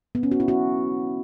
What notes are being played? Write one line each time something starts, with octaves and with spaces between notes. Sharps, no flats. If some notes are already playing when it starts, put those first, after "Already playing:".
B3
C#4
F#4
E4
F#4